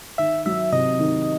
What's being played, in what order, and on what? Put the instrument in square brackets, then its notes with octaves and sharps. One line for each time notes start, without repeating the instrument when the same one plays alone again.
[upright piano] D#3 [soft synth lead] E5
[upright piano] F#3 [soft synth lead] E5
[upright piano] C3 [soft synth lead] D#5
[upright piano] D#3